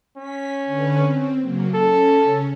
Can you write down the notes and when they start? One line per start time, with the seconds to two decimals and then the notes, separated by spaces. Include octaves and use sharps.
0.17 C#4 B6
0.65 D3 B4
0.99 C4
1.39 C#3 F#3 A#3
1.74 C#4 A4
2.21 C#3 C#4